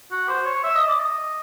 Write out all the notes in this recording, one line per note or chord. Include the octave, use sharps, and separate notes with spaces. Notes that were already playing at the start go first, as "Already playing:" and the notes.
F#4
C5
C#5
E5
D#5
D5
D#5